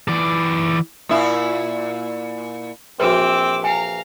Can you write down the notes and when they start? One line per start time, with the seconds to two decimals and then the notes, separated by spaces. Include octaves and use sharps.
0.08 E3 D5
1.09 A#2 E4
3.00 A#1 E3 C4 F#4 B4 D6 E6
3.64 F5 G5 G#5 A#5